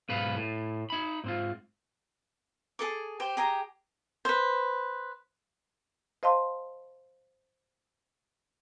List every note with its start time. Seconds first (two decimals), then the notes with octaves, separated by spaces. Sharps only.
0.09 B1 G#2 B4 F5
0.36 A2
0.90 D#4 B5
1.24 G#2 C4 F4
2.79 G#4 A4 D6
3.20 G4 C5
3.37 G4 G#4 A#5
4.25 B4 C5
6.23 C5 D#5 F5 A5 C6